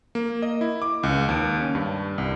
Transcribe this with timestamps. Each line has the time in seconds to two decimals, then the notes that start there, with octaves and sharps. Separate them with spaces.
0.15 A#3
0.42 D#5
0.61 E4
0.82 D6
1.03 C#2
1.29 D#2
1.61 C#4
1.75 G2
2.18 C2